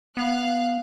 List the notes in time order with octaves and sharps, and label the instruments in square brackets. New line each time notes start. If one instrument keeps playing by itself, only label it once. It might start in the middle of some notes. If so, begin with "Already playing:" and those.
[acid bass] B3 [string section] F5 F#6